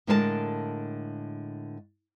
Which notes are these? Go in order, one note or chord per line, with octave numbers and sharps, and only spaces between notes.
A2 D3 G#3 A#4 G5 A5